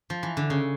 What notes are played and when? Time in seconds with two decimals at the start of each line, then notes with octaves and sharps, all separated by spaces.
0.10 F3
0.23 E3
0.37 D3
0.50 C#3